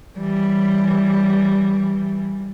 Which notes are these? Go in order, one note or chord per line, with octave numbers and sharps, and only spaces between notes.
E3 G3